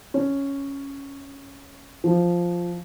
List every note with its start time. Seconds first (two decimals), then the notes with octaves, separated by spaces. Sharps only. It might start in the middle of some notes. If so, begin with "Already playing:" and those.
0.14 C#4
2.04 F3